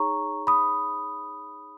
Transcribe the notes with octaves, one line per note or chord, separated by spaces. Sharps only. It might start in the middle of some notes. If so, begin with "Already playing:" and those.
Already playing: D#4 G#4 C#5 A#5 C#6
B5 D#6